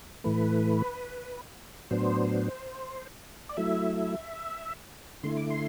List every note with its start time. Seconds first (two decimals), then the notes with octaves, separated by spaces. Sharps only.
0.24 A2 E3 A3 B4
1.91 A2 F#3 B3 D4 C5
3.49 D5
3.57 F#3 A3 E4 E5
5.23 D3 A3 E4 C6
5.37 D6
5.50 C6